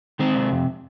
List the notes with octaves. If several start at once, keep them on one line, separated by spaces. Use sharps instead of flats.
D#3 G#3 C4
C3
F2